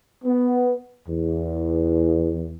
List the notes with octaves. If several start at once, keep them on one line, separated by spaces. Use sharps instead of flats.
B3
E2